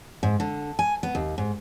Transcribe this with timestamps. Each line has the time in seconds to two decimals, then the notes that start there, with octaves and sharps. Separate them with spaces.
0.23 G#2
0.40 D3
0.79 G#5
1.03 B3
1.15 D#2
1.38 G#2